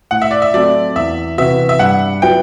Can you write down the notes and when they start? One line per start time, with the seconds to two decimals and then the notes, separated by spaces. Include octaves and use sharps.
0.11 A2 F#5
0.22 E5
0.31 D5
0.42 E5
0.54 F#3 A3 C4 D5
0.96 E2 E5
1.38 C3 E3 B3 F#4 E5
1.69 E5
1.79 G2 F#5
2.22 F#3 B3 E4 G5